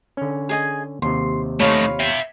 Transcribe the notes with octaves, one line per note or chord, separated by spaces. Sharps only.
D3 C#4
G#4 D#5 G#5
D#2 C3 C6
A3 D#4 F4 C#5 F5 B5
E5 G5